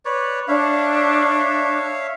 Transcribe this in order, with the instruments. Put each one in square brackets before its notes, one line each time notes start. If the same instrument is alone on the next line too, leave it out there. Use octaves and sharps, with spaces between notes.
[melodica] B4 C#5 D5
[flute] D4 [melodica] C#5 E5 F5